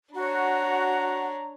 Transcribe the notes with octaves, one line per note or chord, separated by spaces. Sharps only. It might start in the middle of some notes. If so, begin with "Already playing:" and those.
D4 F#4 C#5 A#5